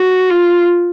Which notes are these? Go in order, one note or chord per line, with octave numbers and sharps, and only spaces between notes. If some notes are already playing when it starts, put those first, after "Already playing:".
Already playing: F#4
F4